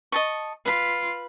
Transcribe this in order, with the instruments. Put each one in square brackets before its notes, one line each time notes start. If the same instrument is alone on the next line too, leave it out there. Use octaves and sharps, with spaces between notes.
[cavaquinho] D#5 A5 C#6
[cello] F4 [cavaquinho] B4 B5